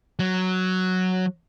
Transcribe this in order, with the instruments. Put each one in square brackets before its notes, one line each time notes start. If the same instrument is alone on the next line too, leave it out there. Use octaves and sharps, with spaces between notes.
[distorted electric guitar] F#3